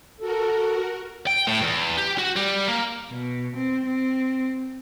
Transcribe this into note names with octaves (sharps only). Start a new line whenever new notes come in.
F#4 A4 A#4
G5
A2
E2
G4
F#4
G3
A#3
B2
C4
C4